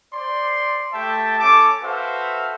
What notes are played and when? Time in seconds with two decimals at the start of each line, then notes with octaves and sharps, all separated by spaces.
0.14 C5 D5 C6
0.93 A3 G4 E5 G5 A5
1.39 C#4 A4 A5 D6
1.82 F#4 A4 B4 C5 E5 F5